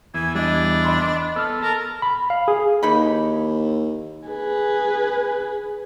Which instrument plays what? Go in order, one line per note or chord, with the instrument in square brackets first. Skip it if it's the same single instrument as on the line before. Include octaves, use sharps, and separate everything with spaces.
[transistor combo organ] E2 E3 B3 [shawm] G#5
[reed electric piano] G3 D#5 [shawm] D4
[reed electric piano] D#5 B5 C6
[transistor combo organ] B3 A4 [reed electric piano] E6 F6
[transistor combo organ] A4 A5 A#5 [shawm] A#4
[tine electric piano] B5
F5
G#4
[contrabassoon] D#2 [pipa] E3 D#4 B5
[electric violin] G#4 B4